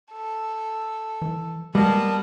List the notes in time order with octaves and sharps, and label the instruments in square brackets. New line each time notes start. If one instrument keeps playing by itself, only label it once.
[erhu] A4
[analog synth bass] E3
[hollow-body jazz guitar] G3 [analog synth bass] G#3 [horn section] A#3 B3 [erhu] A5